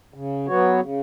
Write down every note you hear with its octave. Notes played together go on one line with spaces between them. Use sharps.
C#3
F#3 B3 F#4 C#5
C#3